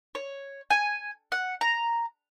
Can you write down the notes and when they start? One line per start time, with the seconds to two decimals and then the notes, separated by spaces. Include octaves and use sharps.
0.15 C#5
0.70 G#5
1.32 F#5
1.61 A#5